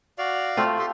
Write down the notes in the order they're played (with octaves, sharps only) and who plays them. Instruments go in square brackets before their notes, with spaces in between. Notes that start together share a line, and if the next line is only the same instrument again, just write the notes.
[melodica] F#4 D5 F5
[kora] A3 C4 F4
[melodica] G4 A4 C6